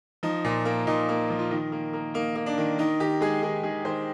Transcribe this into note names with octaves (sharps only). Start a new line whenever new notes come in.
F3 D#4
A#2
A#3
A#2 D#4
A#3
F3
F4
D#3 D#4
A#3
A#3
A#3 D#4
A#3
D4
D#3
D#3 D#4
D#3 G4
G#3 G#4
D#3 G#4
D#3 G#4
D#3 C5